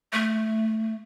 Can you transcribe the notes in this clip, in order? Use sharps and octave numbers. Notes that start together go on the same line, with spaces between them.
A3